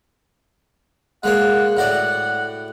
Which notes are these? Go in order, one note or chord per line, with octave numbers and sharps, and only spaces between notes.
G#3 A#3 C#5 F#5
A2 F#4 D5 F#5